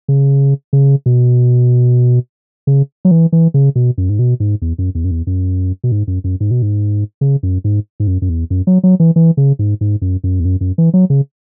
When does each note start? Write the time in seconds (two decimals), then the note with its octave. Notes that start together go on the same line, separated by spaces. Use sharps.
0.08 C#3
0.73 C#3
1.06 B2
2.67 C#3
3.05 F#3
3.11 E3
3.32 E3
3.54 C#3
3.76 B2
3.98 F#2
4.09 G#2
4.19 B2
4.40 G#2
4.62 E2
4.78 F#2
4.95 E2
5.04 F#2
5.11 E2
5.27 F#2
5.84 B2
5.92 G#2
6.08 F#2
6.24 F#2
6.40 G#2
6.51 B2
6.62 G#2
7.21 C#3
7.43 F#2
7.64 G#2
8.00 G#2
8.07 F#2
8.22 F#2
8.29 E2
8.50 F#2
8.67 F#3
8.84 F#3
9.00 E3
9.16 E3
9.37 C#3
9.59 G#2
9.81 G#2
10.02 F#2
10.24 F#2
10.40 E2
10.45 F#2
10.61 F#2
10.78 E3
10.94 F#3
11.10 C#3